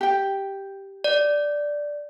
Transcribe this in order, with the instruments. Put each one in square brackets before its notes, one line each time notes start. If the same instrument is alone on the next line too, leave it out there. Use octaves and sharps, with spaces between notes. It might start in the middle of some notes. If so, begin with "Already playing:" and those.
[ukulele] G4 G5
[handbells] D5